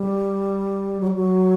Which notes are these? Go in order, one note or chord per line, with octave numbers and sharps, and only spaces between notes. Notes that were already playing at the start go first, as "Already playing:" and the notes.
Already playing: G3
F#3
G3
F#3